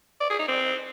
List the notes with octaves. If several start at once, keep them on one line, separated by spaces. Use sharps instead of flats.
D5
G#4
D#4
C4